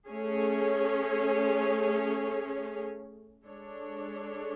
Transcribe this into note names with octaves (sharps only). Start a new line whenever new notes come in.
A3 C#4 G#4 C#5
G#3 D4 A4 C#5